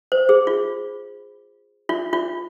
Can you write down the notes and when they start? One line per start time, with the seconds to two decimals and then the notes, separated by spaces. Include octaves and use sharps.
0.12 C5
0.29 G#4
0.47 F4
1.89 F4
2.13 F4